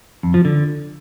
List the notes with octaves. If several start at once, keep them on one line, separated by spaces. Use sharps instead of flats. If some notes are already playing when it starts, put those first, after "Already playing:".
F2
F3
D3